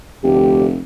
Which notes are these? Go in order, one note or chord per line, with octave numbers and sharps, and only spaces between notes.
F1 D2 G4